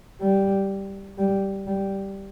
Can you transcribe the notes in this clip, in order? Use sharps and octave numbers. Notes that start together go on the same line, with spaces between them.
G3
G3
G3